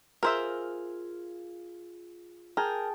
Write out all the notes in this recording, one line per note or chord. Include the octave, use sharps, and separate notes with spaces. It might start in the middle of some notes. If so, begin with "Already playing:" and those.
F4 G#4 A#4 C5 E5
G#4 A#4 G5 A5